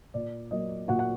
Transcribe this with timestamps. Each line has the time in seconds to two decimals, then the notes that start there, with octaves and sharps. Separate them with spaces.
0.14 A#2 D5
0.51 F#3 A#3 D#5
0.88 A#2 F#4 F#5
0.99 F#5